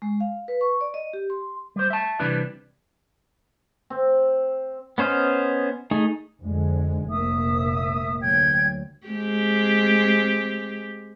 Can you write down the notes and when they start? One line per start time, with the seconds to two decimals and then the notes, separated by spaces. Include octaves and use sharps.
0.02 G#3
0.20 F5
0.48 B4
0.61 C#6
0.81 D5
0.94 D#5
1.13 G4
1.30 C6
1.76 G3 C5
1.90 E5 A5
2.20 C3 E3 G3 D4 B4
3.90 C4
4.98 B3 C#4 C5 D#5 F6
5.91 A3 D#4 G#4
6.42 F2 D3 G#3
7.08 F1 A#1 A#3 E5 D#6
8.21 D2 A#2 F#3 G5 G#6
9.07 G#3 C4 G4